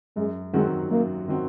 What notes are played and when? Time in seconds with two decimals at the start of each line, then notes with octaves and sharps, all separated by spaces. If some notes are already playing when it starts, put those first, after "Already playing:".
0.16 F#2 G#3
0.53 D#3 F#3 G#3 C4 F#4
0.91 F#2 A#3
1.28 D#3 F#3 C4 F#4